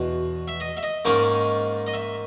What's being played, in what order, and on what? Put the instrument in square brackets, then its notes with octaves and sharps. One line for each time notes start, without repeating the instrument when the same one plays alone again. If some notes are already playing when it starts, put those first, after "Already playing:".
Already playing: [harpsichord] E2 B2
E5
D#5
E5
D#5
G#2 D#3 A#3 C#4
D#5
E5